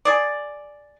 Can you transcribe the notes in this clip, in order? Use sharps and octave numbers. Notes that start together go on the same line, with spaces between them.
G#4 D5